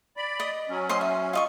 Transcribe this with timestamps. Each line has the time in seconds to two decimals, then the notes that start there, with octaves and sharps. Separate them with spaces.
0.17 D5 B5
0.40 D#5
0.69 F#3 C#4
0.89 C5 D#5 C6
1.01 E5
1.33 F4 D#5 C#6